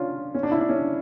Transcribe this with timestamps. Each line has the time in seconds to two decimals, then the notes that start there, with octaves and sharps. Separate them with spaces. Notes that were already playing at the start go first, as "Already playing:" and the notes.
Already playing: C#4 D4 F4
0.34 C#4
0.43 D4
0.51 E4
0.60 D4
0.69 C#4